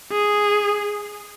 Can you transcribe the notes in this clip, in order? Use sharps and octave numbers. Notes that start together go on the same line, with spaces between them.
G#4